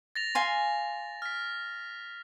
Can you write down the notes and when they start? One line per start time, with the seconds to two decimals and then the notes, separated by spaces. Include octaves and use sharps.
0.16 A6 A#6 F7
0.35 F5 G#5 C6
1.22 F6 B6